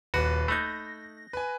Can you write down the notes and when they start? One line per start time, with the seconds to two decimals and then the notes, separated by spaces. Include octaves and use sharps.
0.14 D#1 D#2 F#4 B4
0.48 A3 D#4 B5 F#6 G6 A#6
1.33 B4 G#5